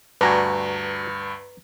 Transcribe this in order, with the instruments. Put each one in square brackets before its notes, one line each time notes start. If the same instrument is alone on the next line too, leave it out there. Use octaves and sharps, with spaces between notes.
[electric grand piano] D2 G2 [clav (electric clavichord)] D4 F#4 G#5 [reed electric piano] B4 A#5